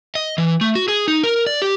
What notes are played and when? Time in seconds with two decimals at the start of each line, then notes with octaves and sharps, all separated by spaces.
0.15 D#5
0.38 E3
0.61 A3
0.75 F#4
0.88 G#4
1.08 D#4
1.23 A#4
1.47 D5
1.62 G4